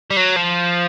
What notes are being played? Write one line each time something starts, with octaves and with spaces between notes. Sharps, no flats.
G3
F#3
F3